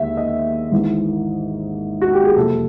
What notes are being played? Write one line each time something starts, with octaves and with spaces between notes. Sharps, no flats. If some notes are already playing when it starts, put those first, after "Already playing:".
Already playing: D#2 D3 G#3 E5
D#5
G#1 G#2 E3
F#4
G4
G#4
F#1 F2 C3 A4